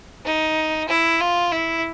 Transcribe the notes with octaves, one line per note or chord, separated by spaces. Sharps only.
D#4
E4
F4
E4